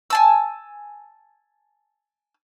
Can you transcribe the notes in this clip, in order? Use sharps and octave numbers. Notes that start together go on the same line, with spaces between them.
G#5 A5 E6